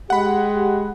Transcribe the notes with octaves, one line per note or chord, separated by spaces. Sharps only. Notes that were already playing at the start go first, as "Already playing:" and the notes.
G#3 G4 F#5 B5